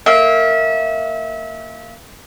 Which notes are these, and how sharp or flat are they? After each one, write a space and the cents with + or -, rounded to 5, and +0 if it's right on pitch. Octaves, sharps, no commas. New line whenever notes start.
A#3 -20 E5 -30